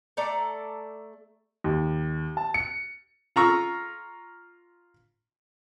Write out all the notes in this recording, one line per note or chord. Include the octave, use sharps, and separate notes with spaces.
A3 A4 D5 A#5
D#2
A5
C#7
F4 A#5 C#6 E6